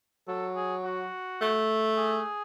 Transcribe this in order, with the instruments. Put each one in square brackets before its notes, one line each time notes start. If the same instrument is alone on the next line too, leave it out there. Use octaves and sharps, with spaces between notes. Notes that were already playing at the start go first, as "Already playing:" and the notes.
[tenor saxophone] F#3 [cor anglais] A4
[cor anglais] G#4
F#4
[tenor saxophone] A3
[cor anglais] G#4